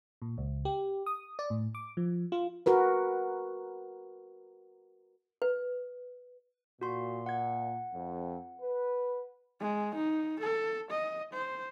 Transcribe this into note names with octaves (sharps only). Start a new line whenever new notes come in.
A#2
C#2
G4
D#6
D5
A2
D6
F3
F4
F#4 A#4 B4
B4
A#2 F#4 C6
F#5 G#6
F2
B4
G#3
D#4
A4
D#5
C5